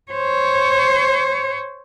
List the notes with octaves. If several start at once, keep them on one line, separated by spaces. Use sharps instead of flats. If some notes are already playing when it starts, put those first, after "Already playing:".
C5 C#5